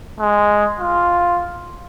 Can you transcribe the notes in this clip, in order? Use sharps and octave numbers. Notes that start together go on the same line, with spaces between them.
G#3
F4